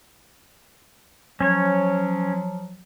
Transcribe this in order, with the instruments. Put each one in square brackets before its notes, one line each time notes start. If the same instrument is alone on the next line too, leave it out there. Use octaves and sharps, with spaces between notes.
[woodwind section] F3 F#3 [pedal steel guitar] C#4 C#5